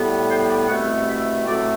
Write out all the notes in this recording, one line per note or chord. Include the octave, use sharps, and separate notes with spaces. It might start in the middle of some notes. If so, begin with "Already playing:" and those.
Already playing: A2 G3 B3
C5
D5
C2 B2 A3 C4 F#5
E5
E5
E5
A2 F#3 A3 C4 D5